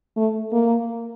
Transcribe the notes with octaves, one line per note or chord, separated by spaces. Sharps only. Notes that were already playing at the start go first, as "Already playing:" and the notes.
A3
A#3